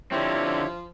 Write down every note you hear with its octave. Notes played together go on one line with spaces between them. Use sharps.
D3 F3 C4 E4 G4 C#5